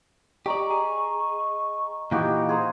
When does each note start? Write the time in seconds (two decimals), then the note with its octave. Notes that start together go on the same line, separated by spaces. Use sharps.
0.46 G4 D5 D#5 A#5 C#6
0.71 G#4
2.11 A#2 E3 D#4 F#4 G4 F5
2.49 G#4 C5 A#5